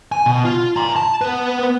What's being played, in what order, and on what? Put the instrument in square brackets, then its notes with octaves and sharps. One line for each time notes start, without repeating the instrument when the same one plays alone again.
[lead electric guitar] G#5
B2
F4
A#5 C6
A5
B3 B4